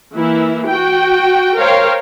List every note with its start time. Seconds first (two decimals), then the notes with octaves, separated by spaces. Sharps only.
0.13 E3 A#3 E4
0.69 F#4 G5
1.57 A#4 C5 C#5 F5 G5